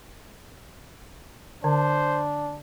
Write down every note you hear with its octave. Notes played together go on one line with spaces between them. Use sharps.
D3 D4 C5